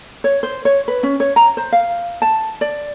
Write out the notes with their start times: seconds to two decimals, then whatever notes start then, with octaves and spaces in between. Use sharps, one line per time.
0.24 C#5
0.43 C5
0.65 C#5
0.88 B4
1.03 C#4
1.20 C#5
1.36 A#5
1.57 C5
1.73 F5
2.22 A5
2.61 D5